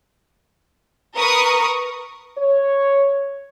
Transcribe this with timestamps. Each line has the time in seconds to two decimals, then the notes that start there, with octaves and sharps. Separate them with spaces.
1.17 A#4 B4 C#6 D#6
2.39 C#5